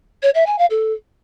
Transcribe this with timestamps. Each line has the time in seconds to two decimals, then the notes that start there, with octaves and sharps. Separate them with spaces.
0.23 C#5
0.35 E5
0.46 G#5
0.58 F5
0.70 A4